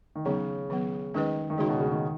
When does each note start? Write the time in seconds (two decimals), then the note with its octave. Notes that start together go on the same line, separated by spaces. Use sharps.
0.15 D#3
0.25 C#3 F#3 B3 D#4
0.70 D#3 F#3 B3
1.14 D#3 G#3 C#4 G#4 B4 D#5
1.50 D#3
1.58 C#3 G#3 D#4 F#4 C#5
1.69 B2
1.80 C#3
1.92 D#3